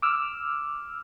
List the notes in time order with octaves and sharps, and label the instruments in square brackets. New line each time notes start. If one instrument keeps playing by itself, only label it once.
[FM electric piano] D6 E6 F6